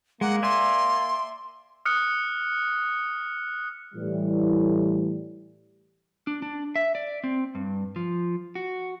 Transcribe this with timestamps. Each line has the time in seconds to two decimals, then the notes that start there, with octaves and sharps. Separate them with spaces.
0.21 G#3 A#3 F#5
0.43 D5 E5 G#5 C6
1.85 D#6 F6 F#6 C#7
3.95 A2 E3 G3
6.27 D4
6.42 D4
6.76 E5
6.95 D5
7.24 C4
7.55 G2
7.96 F3
8.55 F#4